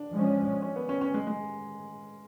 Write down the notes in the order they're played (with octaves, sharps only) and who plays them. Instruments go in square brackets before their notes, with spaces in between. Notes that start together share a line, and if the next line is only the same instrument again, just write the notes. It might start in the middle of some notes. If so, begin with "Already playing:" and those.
Already playing: [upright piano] D4
[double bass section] F3 G#3 C#4
[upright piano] C#4
B3
C#4
C#4
G#3
G#3